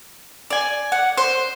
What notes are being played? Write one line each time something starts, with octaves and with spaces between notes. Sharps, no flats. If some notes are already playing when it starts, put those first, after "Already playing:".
D5 G#5
F#5
C5